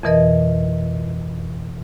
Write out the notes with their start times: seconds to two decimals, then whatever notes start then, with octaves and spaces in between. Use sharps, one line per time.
0.03 F2 B2 E3 A#4 D#5